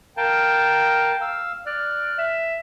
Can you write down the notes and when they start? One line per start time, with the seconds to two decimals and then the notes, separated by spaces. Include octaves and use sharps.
0.17 A#4 F5 G5 A5
1.21 F5 E6
1.66 D5 F6 F#6
2.18 E5